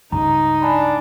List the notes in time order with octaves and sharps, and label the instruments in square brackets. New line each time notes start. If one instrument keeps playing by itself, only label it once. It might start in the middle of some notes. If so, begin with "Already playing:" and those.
[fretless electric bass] C#2 G2 [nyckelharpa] D#4 [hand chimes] A#5
[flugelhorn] D4 [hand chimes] G#5 B5